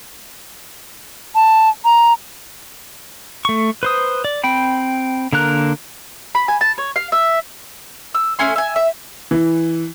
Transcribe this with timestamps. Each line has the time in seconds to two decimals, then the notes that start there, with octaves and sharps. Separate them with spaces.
1.35 A5
1.85 A#5
3.45 A3 C#6
3.83 B4 C5 D#6
4.25 D5
4.44 C4 G5 B5
5.33 D3 A#3 A#4 F#6
6.35 B5
6.48 G#5
6.61 A5
6.78 C#5
6.96 F5
7.12 E5
8.14 E6
8.39 A3 C#4 G#5 C6
8.56 E5 G#5
8.76 E5
9.31 E3